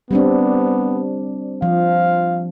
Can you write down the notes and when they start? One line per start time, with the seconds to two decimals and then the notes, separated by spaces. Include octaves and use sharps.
0.11 G3 B3 C4 D4
1.62 F3 F5